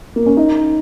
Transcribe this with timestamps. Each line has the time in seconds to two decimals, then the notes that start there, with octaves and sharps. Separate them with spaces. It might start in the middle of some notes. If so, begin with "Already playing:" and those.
0.16 A#3
0.26 C#4
0.37 D#4